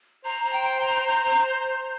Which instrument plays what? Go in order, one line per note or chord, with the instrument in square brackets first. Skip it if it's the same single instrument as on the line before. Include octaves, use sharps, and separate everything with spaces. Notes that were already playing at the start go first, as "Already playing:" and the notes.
[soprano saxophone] C5 [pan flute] A#5
[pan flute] A#5
G5
A#5
A#5